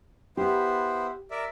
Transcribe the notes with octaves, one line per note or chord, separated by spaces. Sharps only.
B3 E4 G4 C5
A#4 D5 E5